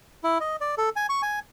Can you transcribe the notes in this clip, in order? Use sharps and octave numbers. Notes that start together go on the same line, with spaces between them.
E4
D#5
D5
A4
G#5
C#6
G#5